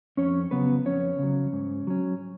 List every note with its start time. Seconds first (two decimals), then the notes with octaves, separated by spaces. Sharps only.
0.17 F2 C#4 C#5
0.51 C#3 F#3 B3 B4
0.85 F2 C#4 C#5
1.19 C#3 F#3
1.53 G#2
1.87 F#3 C#4